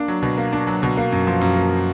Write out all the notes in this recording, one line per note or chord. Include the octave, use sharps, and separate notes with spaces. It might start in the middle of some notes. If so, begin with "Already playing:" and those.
Already playing: A#3 D4
F#3
B2
A#3
D4
F#3
B2
A#3
F#2
F3
F#2
A#3